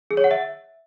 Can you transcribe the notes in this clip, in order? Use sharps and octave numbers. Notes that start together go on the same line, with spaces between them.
G#4
C#5
F#5
E5